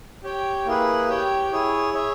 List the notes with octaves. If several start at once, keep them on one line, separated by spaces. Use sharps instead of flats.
G4 C#5 G5
A#3 E4 G#4 B4
G4 C#5 G5
E4 G#4 C#5
G#4 C#5 E5